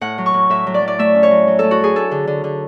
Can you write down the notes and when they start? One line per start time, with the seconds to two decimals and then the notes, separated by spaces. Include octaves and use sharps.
0.01 A2 F#5
0.18 F#3
0.26 C#6
0.34 A2
0.50 A2 E5
0.67 F#3
0.74 D5
0.82 F#3
0.88 D5
0.99 A3 E5
1.15 C#4
1.23 C#5
1.31 F#3
1.47 F#3
1.59 A3 A4
1.71 F#4
1.79 F#3 G#4
1.95 D4 A4
2.11 D3
2.27 D3
2.44 D3